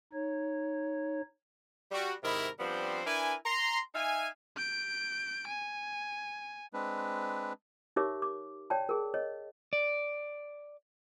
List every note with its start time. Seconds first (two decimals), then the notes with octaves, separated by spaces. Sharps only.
0.13 D#4 C#5
1.92 G3 F#4
2.23 G#2 C3 D#3 E4 A#4 B5
2.59 F3 G3 B3 C4 D4 C5
3.06 D4 E4 A#4 B4 G#5
3.45 A#5 C6
3.95 D#4 E5 F5 G#5
4.56 G6 D7
5.47 G#5
6.73 G#3 C4 D4 B4
7.96 D#4 G4 A#4 C#5 E5 D6
8.22 D6
8.70 C#5 D5 G5 A5
8.89 G#4 A#4
9.14 C#5 D#5
9.73 D5